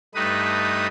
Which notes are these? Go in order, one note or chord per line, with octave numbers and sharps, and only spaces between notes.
G2 A3 D#4 B4 D#6